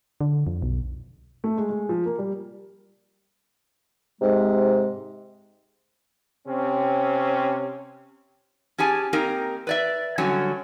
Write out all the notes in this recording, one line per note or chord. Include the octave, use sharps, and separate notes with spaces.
D3
F2
B1
A3
G#3
G#3
F3
A#3
G3
G#2 C3 G#3
C3 C4 C#4
C#4 G4 G#4 G#5 A5
A#3 C4 D#4 G4 A#4
B4 D5 E5
D3 F#3 G3 C#4